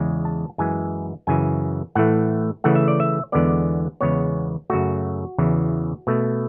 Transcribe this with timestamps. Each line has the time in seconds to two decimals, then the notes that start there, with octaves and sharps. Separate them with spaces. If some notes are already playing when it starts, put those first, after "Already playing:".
Already playing: E2 C#3 G#3
0.25 A5
0.58 F#2 E3 G#3 G#5
1.27 F#2 C#3 E3 G#5
1.95 A2 E3 A3 F#5
2.64 C#3 E3 A3 F#5
2.75 E5
2.88 D5
3.00 E5
3.32 E2 D3 G#3 B3 D5
4.01 E2 C#3 G#3 B3 C#5
4.70 F#2 C#3 F#3 A3 F#4
5.38 E2 C#3 E3
6.07 B2 A3